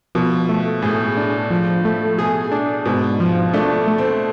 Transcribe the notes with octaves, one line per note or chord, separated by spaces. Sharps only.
B2 F3
A3
A2 G#4
D4
F3
A3
B2 G#4
D4
G#2 B2
F3
A3 D4
A3
C4